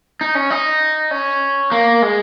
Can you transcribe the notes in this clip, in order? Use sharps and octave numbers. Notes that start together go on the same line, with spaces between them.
D#4
C#4
D#4
C#4
A#3
G#3